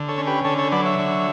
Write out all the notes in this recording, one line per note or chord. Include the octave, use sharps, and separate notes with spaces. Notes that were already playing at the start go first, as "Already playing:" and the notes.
Already playing: D3
A4 C#5
C#4
G4 B4
D3 A4 C#5
A4 C#5
F#3 B4 D5
C#5 E5
D3